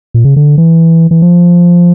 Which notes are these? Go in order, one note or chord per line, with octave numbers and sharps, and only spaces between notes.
A#2
C#3
D3
E3
E3
F3